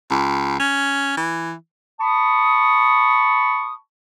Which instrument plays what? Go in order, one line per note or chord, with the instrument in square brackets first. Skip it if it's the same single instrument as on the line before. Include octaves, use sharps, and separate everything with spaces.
[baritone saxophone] C#2
C#4
E3
[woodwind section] A5 B5 C#6 D#6